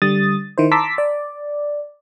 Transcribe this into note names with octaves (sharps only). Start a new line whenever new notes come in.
D3 G3 D#6 A6
D#3 E4 C5
A5 A#5 C6 D6 E6 B6
D5